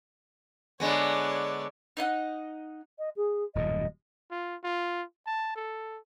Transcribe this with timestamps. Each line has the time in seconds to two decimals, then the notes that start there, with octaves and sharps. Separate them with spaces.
0.80 D3 G#3 B3 C#5 D5
1.97 D#4 D#5 F5 F#5
2.99 D#5
3.16 G#4
3.55 D#1 F#2 A2 D#5
4.31 F4
4.64 F4
5.26 A5
5.56 A4